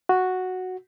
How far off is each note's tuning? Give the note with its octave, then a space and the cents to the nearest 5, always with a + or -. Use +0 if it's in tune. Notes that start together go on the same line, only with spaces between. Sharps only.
F#4 -5